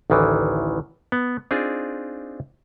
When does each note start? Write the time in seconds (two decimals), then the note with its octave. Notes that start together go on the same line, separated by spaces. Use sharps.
0.10 A1 D2 D#3 E3
1.12 B3
1.51 C4 D4 D#4 F4 G#4